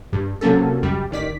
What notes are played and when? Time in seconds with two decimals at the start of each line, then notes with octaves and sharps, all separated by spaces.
0.13 G2
0.41 C3 F#3 A#3 C#4 A4
0.82 C#2 F#2 G3
1.11 A1 D#3 D5 B6